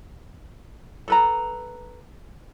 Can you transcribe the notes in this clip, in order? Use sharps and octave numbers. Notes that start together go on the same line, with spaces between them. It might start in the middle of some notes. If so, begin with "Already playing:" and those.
A4 B4 A#5